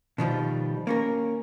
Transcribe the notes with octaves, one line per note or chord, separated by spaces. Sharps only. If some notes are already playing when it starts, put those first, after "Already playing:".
B2 D#3 F3 G3
A#3 C#4 A#4